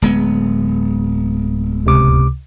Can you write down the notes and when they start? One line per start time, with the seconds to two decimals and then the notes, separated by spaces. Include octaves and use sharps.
0.02 D1 G#3 B3
1.86 C#2 C3 D6